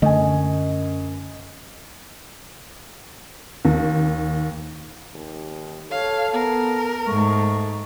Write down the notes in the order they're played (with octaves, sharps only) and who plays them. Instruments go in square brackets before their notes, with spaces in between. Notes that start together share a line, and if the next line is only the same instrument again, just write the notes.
[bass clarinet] F#2 [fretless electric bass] D3 A3 [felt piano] D#5 G#5
[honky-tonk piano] D#2
[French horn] D#2
[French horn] A4 [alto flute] C#5 [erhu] F5
[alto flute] B3 [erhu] A#4
[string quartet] G#2 [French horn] A3 [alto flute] C#6